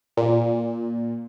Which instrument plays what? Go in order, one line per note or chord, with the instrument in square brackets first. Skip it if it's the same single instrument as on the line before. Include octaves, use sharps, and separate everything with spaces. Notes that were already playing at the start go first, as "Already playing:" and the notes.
[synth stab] A#2